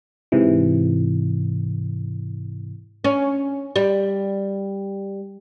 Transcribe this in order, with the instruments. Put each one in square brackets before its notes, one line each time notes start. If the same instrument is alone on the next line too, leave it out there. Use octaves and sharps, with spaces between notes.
[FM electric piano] G#2 C3 E3
[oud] C#4
G3